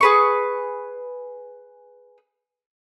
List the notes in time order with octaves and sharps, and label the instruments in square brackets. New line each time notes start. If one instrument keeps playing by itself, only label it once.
[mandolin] G#4 B4 C#6